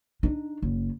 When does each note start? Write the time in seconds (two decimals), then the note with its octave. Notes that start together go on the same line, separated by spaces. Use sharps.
0.23 D4 D#4
0.62 F#1